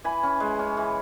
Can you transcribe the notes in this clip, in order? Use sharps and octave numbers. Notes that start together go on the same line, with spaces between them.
E3 G#5 B5
C#4
G#3
C#4
E3